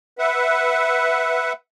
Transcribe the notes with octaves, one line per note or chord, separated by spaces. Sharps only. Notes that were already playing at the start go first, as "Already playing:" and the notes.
B4 E5 F#5